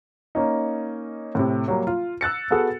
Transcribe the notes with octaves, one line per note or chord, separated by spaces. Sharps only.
A#3 C#4 D#4
A2 C3
F#3 G3 A#3
F4
E6 F#6 A6 C#7
B3 F#4 G#4 A4